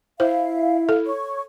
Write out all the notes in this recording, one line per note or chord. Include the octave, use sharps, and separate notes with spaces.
E4 C5 E5 F5
A4
C#5 C#6